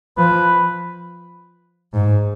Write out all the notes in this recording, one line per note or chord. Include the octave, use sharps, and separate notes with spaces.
F3 B4
G#2